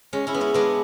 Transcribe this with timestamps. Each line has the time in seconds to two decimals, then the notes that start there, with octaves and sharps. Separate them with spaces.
0.13 G#3 C#4
0.27 C#4 E4
0.34 B3
0.41 C#4 E4
0.54 G#3 B3 D4